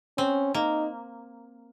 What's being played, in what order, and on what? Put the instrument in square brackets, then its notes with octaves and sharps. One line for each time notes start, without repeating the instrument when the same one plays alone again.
[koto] C4 [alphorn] C#4
[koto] A#3 [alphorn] D#4